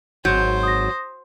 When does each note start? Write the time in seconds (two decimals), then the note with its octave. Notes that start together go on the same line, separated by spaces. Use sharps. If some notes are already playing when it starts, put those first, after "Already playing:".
0.25 G#1 F#3 C5 G6
0.63 D#6 A#6